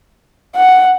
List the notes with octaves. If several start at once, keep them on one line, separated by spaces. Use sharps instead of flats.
F#5